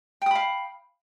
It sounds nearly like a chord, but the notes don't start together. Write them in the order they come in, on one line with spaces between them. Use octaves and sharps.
G5 D#6 B5 F5